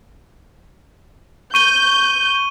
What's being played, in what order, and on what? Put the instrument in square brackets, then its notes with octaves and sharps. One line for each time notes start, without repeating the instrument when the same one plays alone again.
[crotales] C#6 D#7 G7 [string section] G6